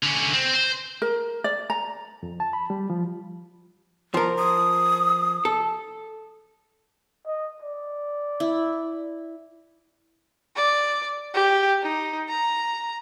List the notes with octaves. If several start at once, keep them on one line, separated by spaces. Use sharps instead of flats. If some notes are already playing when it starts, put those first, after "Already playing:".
D3 C#4
C4
C5
A#4
D5
A#5
F2
A5
B5
G3
F3
F3 A#4
D#6
A4
D#5
D5
E4
D5
G4
D#4
A#5